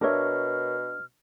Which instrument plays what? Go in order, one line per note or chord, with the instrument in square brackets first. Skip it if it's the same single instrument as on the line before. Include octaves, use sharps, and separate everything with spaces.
[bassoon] B2 [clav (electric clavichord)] D4 E5 [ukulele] A#4 C#5 [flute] F6